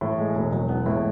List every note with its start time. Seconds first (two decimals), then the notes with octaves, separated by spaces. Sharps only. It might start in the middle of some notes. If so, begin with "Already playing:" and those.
0.01 A2 E3
0.19 G#3
0.35 E1
0.52 E1 F#3
0.69 E3 B3
0.86 A2 G#3